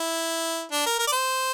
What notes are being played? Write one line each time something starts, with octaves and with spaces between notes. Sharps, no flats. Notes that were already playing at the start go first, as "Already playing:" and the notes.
Already playing: E4
D4
A#4
A#4
D5
C5